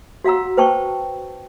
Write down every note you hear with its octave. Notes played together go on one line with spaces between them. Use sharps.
F#4 F5 F#5 A#5 E6
B4 C5 G5 A5 C#6